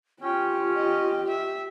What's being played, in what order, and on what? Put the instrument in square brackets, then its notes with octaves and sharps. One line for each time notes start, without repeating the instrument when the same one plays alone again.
[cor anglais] C#4 [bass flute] F4 [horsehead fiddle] G4 [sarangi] G5
[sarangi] D#5
E5